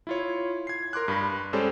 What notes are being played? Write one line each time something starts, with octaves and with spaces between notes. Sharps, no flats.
E4 F4 C#5
G#6 C7
A#4 C6 D6 F#6
G2 B5
G#3 C#4 G4 A4 C5 D5